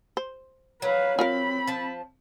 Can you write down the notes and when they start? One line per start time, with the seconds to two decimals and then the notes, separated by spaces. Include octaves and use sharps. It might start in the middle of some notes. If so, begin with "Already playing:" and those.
0.17 C5
0.82 F#3 B4 F5
1.19 C4 F4 A#4 F5 B5
1.67 F3 A5